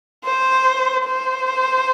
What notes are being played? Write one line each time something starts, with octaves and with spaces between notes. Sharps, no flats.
C5
C5